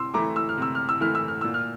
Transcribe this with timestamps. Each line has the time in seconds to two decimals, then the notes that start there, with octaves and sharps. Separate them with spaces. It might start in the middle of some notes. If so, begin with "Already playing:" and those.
Already playing: C3 C6 E6
0.14 E3 A3 E4 A#5 D6
0.36 E6
0.49 F6
0.58 C3 E6
0.75 F6
0.89 E6
1.01 E3 A3 E4 F6
1.15 E6
1.28 F6
1.41 A#2 E6
1.54 F6